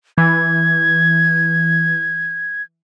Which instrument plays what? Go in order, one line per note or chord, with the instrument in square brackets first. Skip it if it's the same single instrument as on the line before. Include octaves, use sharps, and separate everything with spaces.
[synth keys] E3 [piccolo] G#6